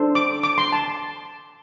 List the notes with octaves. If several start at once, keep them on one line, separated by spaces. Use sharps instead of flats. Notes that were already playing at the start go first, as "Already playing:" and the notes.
Already playing: D4 A4 C5
D6
D6
C6
A5